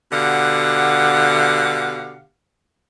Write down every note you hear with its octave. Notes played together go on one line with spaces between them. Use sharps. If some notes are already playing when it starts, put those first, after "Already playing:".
B2 D3 G4 F5 F#5